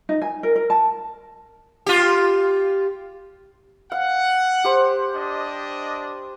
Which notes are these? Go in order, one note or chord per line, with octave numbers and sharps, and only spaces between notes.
D#4
G#5
A#4
A#4
A5
F4 G4
F5 F#5
G4 C5
D4 D#5